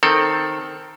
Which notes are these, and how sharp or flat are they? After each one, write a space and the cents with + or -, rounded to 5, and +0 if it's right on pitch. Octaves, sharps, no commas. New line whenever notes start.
D#3 +0 C4 +10 A4 +15